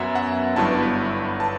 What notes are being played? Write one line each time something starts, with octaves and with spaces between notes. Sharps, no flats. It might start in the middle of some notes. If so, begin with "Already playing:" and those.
Already playing: F#2 F#3 B3 E5 F#5
F#5
G1 G2 F#3 B3 E4 A5
B5
A5